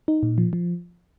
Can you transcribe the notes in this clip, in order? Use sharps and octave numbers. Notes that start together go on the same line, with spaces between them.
D#4
A#2
F3
F3